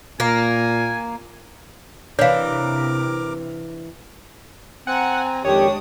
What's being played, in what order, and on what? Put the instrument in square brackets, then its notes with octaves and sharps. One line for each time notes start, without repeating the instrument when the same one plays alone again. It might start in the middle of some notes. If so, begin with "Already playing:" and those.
[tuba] A#2 [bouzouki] A#3 [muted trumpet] G#5
[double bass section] C3 [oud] E3 D4 [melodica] A#4 A#5 D6 [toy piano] C#5 F5
[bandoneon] C4 [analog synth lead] F#5 [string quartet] G#5 A#5
[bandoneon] F2 D#3 [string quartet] G#3 D4 D#6 [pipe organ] G4 [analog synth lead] C#5